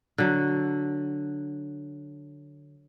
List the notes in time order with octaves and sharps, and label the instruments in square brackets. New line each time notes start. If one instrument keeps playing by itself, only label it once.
[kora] D3 F#3